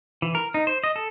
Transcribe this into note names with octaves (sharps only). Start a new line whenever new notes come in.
E3
A#4
D#4
C5
D#5
A4